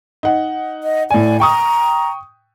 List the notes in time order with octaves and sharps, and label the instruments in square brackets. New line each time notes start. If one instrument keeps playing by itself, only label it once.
[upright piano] D#4 F#5
[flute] D#5
[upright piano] A2 G#5 [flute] D5
[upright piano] G5 C#6 D#6 [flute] A#5